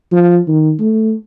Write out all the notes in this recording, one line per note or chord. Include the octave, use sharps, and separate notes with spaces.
F3
D#3
A3